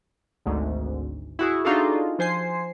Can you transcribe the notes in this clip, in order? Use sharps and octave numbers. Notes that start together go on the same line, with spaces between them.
G#1 D2 G#2
E4 F#4 G#4
D4 D#4 F4 F#4 G#4 A4
F3 C5 G#5 C7